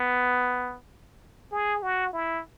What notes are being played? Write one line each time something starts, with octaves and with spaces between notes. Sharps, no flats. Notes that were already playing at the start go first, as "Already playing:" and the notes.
Already playing: B3
G#4
F#4
E4